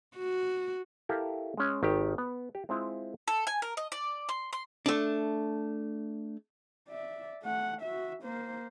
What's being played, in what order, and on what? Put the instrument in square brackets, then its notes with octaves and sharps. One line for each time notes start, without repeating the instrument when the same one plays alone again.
[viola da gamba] F#4
[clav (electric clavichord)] E4 G4 A4 A#4 E5 F5
G#3 C#4
G#1 D#3 G4
B3
G4
G#3 C4 E4 F4
[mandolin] A4
G#5
A#4
D#5
D5
C6
C6
[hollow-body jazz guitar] A3 D4
[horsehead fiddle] D5 E5
A3 F#5
F#4 E5
A#3 C5